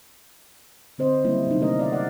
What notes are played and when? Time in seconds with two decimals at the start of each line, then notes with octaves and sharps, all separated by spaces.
0.98 D3 C4 C5 D#5
1.24 D#3 F#3 G3 A#3 C#4 E4
1.47 C3 F#3 G3 C4 D#4
1.60 D#3 A3 C#4 D4 A#4 D#5
1.79 D5 D#5 F5
1.92 F#3 D5 F#5